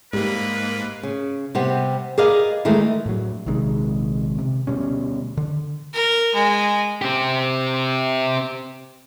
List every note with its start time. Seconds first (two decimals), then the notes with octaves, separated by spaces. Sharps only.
0.13 G#2 G3 A#3 B4
1.03 C#3
1.55 C3 G3 B3 C4
2.18 G#4 A#4 B4 D5 D#5 F5
2.65 D#3 E3 G#3 A3
3.06 A2 F#3
3.46 A#1 C3 D#3 G#3
4.38 C3
4.67 D2 B2 G3 C#4
5.37 D3
5.94 A#4
6.35 G#3
7.02 C4 G4